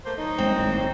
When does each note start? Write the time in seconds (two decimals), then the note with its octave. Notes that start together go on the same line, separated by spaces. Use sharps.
0.05 A3 A#3 C5
0.18 F#3 D#4
0.38 G#1 G#3 A#3 C4
0.58 G#1 A2